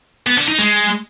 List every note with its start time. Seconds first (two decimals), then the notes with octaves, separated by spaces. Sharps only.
0.27 B3
0.38 D3
0.48 D#4
0.59 G#3